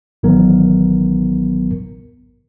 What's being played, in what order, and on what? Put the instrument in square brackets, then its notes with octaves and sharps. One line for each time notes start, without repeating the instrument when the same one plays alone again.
[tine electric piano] A1 D#3 F#3 B3 A#4